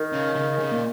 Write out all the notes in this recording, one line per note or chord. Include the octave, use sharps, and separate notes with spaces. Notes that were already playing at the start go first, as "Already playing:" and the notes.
Already playing: D#3
C#3
C#3
C#3
A#2